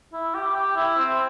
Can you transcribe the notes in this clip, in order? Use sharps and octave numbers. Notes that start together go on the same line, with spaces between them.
E4
G4
G4
E4
C4